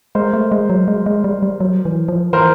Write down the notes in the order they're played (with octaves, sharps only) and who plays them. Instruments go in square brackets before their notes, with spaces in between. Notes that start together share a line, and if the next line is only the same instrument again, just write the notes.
[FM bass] G#3 [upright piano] A#4 C5
[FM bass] A3
G#3
F#3
G#3
G#3
G3
G3
F#3
E3
F3
[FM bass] E3 [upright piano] A#4 C5